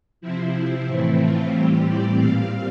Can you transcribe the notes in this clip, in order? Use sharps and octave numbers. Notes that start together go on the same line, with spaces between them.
C3 F3 C4 E4
A2 E3 A3 C4
F4
A2 E3 G3 C4 G4
D5
A#2 G3 C4 F5